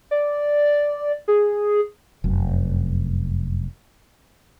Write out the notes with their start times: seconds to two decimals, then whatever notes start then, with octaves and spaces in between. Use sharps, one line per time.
0.11 D5
1.28 G#4
2.24 F1 F#2